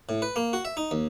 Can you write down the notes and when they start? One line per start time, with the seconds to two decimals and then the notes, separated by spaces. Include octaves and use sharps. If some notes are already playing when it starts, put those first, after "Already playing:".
0.09 A2
0.22 B4
0.36 A#3
0.53 F#4
0.65 E5
0.77 D#4
0.91 D#2